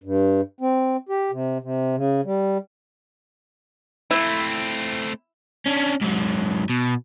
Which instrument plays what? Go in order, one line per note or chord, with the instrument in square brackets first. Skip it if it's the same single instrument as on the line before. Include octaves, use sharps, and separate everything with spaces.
[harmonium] G2
C4
G4
C3
C3
C#3
G3
[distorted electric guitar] A3 C4 [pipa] E4
[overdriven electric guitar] C#4 D4
G#2 F#3
B2